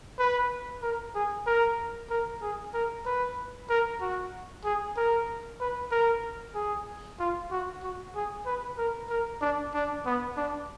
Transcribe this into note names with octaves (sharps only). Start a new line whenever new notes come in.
B4
A#4
G#4
A#4
A#4
G#4
A#4
B4
A#4
F#4
G#4
A#4
B4
A#4
G#4
F4
F#4
F#4
G#4
B4
A#4
A#4
D4
D4
B3
D4